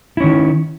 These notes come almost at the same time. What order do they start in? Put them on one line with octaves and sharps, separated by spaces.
E4 C#4 D#3